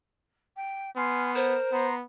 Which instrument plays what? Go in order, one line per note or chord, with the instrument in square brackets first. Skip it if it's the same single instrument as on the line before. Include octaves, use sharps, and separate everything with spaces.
[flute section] G5
[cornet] B3 [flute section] G#5 C6 F6
[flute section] A#4 [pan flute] C5
[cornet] B3 [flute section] A#5 C6